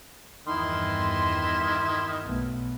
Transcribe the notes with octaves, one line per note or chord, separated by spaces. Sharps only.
E2 G2 D#3 E4 C6
B1 A3 B3